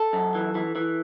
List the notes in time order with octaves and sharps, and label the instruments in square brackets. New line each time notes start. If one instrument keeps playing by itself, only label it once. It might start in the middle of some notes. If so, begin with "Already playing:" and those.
Already playing: [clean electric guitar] A4
F#2
E3
E3
E3